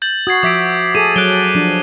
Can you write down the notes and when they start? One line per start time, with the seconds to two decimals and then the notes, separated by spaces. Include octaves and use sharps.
0.02 G6 A6 F#7
0.27 F#4 D#6 G#6 C7
0.43 F3 E5 D6 B6 D7
0.95 G#4 A4 D6 D#7
1.16 F#3 F#6 D7 G7
1.55 F3 D4